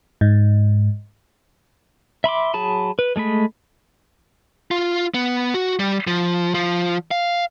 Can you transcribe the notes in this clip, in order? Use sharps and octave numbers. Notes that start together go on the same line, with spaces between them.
G#2
E5 B5 C6 D6
F#3 G#4 A5 B5
B4
G#3 A3 G#4 B5
F4
B3
F#4
G3
F3
F3
F5